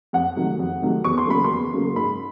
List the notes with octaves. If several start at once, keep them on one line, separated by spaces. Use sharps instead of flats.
F2 F#5
C3 D#3 F#3 A3
F2
C3 D#3 F#3 A3
E2 C#6
C6
C#3 F#3 A#3 B5
C6
E2
C#3 F#3 A#3
G#2 B5